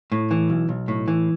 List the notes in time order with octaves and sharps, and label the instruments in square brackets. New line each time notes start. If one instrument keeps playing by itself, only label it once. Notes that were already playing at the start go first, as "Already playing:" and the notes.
[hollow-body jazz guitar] A2
E3
B1
B1
A2
E3